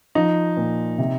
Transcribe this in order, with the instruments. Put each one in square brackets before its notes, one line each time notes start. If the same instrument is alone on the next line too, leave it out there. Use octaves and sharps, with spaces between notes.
[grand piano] F3 D#4
A#2
C3